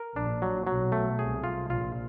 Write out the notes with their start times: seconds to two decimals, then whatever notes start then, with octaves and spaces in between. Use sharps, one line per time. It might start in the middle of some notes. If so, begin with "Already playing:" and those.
Already playing: A#4
0.16 A#1 A#2 D4
0.42 F#3
0.67 B1 B2 F#3
0.92 A3
1.18 C2 C3 G#4
1.44 F4
1.69 A#1 A#2 F4